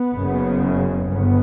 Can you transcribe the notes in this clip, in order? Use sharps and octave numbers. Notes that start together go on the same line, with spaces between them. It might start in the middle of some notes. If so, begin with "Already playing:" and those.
Already playing: B3
F#1 F#2 C#3
G1 B3